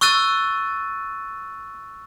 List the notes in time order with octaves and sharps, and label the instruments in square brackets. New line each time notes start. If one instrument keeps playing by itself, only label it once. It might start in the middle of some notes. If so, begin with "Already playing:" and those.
[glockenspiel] C#6 E6 F#6 A6 D#7